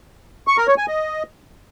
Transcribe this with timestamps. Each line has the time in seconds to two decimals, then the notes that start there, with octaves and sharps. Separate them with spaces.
0.47 C#6
0.58 A#4
0.68 C#5
0.78 G#5
0.88 D#5